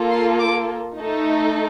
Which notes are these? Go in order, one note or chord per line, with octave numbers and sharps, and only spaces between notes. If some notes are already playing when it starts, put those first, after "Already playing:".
Already playing: A#3 F4 A4
C6
D6
A3 D#4 A4